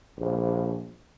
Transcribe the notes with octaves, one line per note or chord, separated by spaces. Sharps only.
A#1